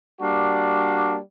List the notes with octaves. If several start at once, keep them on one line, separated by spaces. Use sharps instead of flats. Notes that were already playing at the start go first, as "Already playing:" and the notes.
G3 A#3 D4 F#4